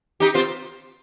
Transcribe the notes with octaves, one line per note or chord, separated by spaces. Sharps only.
D#4 G4
C4 F4